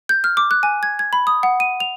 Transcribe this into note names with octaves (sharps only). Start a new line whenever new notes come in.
G6
F6
D6
F#6
G#5
G#6
G#6
B5
D#6
F#5
D#7
F7